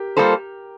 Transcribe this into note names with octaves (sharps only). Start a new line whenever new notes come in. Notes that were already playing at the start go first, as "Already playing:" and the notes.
Already playing: G4 A#4
G3 A#3 F4 A4 C5